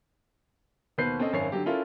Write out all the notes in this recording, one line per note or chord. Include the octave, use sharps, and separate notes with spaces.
D#2 B2 B4 C5 G6 C7
C4 C#4 A4 D#5
G#1 F#2 C#5 G#5 C7
D3 F#3 G4
C#4 E4 F4 A4 A#4